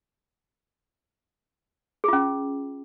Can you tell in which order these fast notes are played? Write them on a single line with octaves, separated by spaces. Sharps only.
G#4 F4 C#4